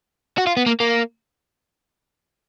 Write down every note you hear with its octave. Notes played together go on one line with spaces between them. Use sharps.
F#4
F4
B3
A#3
A#3